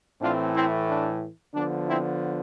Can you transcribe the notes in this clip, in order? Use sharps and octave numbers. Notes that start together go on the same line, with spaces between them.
A2 E3 A3 C4 D4 F4
C4 E4
D4
D3 F3 B3 D4
C4 E4